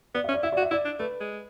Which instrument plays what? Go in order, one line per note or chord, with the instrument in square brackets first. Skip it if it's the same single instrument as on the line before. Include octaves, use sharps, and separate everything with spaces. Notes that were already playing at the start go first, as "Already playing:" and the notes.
[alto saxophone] B3 [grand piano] D5
[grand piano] E5
[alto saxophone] C#4
[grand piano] D5
[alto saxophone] E4 [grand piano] E5
[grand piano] D5
[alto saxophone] F#4
[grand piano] E5
[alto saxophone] E4 [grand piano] D5
[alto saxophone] D4
[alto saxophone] A3 [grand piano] B4
[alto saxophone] G#3